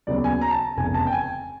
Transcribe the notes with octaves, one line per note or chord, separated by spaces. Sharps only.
D#2 C#3 F#3 B3 D5
G#5
A#5
A5
F1 E2 C#3 G#5
A5
G5
G#5